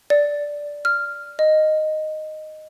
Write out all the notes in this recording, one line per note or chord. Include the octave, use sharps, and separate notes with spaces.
D5
F6
D#5